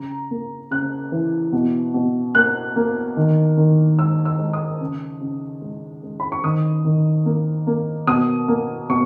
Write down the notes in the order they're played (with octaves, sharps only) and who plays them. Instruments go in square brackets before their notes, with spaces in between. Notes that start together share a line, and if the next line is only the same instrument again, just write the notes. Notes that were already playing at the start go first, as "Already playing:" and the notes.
Already playing: [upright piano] C#3 A#5
A#3
C#3 F#6
E3
B2
B2
A#3 F#6
A#3
D#3
D#3
G#3 E6
E6
G#3
D#6
C#3
C#3
G#3
G#3
B5
C#6
D#3 D#6
D#3
A#3
A#3
B2 D#6
A#3
B2 C#6